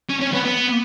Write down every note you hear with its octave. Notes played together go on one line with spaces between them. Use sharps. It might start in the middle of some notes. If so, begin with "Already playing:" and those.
C#4
C#4
B3
B3